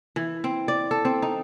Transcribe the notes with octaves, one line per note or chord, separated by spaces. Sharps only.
E3
C4
D5
A4
C4
D#4